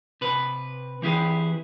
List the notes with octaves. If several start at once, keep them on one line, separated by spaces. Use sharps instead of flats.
C3 B4
E3 C4 E4 G4 G#4 B4